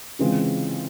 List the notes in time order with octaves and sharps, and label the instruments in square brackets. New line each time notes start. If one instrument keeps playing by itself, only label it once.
[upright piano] C#3 E3 G#3 C4 F4